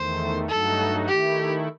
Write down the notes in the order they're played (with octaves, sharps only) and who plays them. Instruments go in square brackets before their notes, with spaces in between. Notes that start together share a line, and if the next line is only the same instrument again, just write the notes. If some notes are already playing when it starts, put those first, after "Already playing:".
Already playing: [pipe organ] E2 D#3 A3 [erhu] C5
[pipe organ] G2 F#3 A3 D#4 F#4 [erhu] A4
[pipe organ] D#3 A3 E4 [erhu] G4